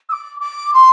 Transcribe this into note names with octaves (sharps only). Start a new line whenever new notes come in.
E6
D6
D6
C6